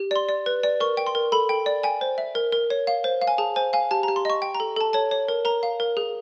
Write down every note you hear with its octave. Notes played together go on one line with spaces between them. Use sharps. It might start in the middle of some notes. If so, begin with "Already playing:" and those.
Already playing: G4
D5 C6
D5
B4
D5
A#4 C#6
G5
C6
A#4
A4 B5
G5
D5
G5 G#5
C5
E5
A#4
A#4
C#5
F5
C5
F5
G#5
G#4 A5
C5 G#5
F5 G#5
G4 A5
A#5
G4
C6
D#5 C#6
G5
A#5
A4
A4 A5
C#5 A5
C#5
A#4
A#4 A#5
F5
A#4
G#4